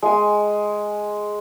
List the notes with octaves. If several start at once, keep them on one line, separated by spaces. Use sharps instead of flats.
G#3 G#5